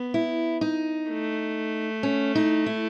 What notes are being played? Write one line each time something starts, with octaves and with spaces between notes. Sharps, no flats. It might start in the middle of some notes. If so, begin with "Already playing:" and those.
Already playing: B3
E4
D#4
A3
C#4
D#4
E4